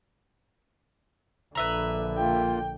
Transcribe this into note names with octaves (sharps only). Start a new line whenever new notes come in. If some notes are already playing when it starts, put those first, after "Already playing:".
A#1 D3 B4 E5 A#5
A#3 F4 G5